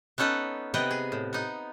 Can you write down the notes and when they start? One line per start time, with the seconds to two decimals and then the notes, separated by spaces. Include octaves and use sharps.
0.18 B3 C#4 D#4 A4 B4
0.74 C3 B3 B4 D#5 G5
0.91 G#4
1.12 A2
1.33 B3 D#4